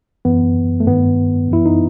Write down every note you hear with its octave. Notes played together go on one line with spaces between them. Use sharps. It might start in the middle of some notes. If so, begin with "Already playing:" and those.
F#2 E3 B3
A3
G2 D#3 B3
F#2 E3 E4
D#4